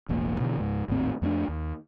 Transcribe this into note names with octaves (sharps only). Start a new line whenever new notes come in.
E1 A1 A#3
B2 D3 E3
C#2 G#2
G#1 D#2 A2 C4
F2 A3 B3 D4
D#2